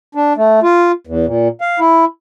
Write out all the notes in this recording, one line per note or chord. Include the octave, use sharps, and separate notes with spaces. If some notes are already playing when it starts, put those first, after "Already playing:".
D4
A3
F4
E2
A#2
F5
E4